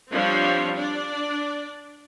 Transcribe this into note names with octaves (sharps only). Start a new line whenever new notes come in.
F3 G3 C4 D4 C#5
D4 D5